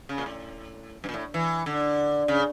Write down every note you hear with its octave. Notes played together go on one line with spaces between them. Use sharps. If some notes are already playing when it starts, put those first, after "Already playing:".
C#3
A#2
A2
G2
A#2
A2
E3
D3
C#3